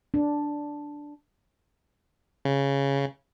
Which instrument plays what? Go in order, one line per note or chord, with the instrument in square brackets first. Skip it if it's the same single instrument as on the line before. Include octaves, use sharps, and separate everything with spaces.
[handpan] D4
[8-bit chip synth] C#3